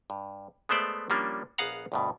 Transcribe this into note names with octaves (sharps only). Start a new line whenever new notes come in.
G2
G#3 A3 B3 C5 D5 E5
F3 G3 A#3 C#4 D4
A#1 B3 G#4 F5 F#5 A#5
D2 G2 B2